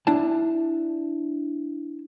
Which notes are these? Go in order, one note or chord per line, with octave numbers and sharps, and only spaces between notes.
D4 E4 A5